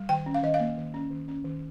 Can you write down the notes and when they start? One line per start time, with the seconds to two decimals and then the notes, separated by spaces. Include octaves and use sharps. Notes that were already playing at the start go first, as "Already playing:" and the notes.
Already playing: G3
0.09 D#3 G5
0.26 C#4
0.34 F5
0.43 D#3 D#5
0.54 F5
0.60 A#3
0.77 D#3
0.94 C#4
1.10 D#3
1.28 C#4
1.45 D#3